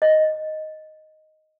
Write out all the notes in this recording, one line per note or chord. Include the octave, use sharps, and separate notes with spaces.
D#5